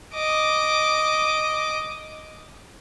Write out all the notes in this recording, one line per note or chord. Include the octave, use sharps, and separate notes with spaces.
D#5 D6